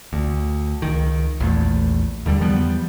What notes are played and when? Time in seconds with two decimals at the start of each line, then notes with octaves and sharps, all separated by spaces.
0.13 D2
0.82 C#2 D#3
1.40 A#1 E2 A3
2.26 D#2 D3 G3
2.41 E2 F3 G3 B3